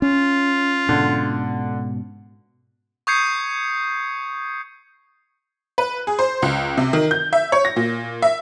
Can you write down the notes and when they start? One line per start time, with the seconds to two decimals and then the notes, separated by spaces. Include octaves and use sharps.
0.02 C#4 F4
0.89 G#2 B2 D3
3.07 C#6 D#6 G6 G#6 C7 C#7
5.78 B4
6.07 G#4
6.19 C5
6.42 C#2
6.77 C3
6.93 D#3
7.11 G6
7.33 E5
7.52 C#5
7.65 A#6
7.76 A#2
8.22 E5